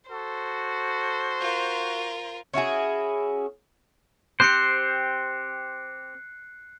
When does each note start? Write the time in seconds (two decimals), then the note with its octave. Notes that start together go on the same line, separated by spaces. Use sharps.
0.10 F#4 A4 C5
1.40 F4 A#4
2.54 C#4 E4 F#4 G#4
4.40 C4 G4 C5 F#6 C7 C#7